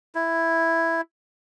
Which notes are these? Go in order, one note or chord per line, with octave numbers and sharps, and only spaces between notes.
E4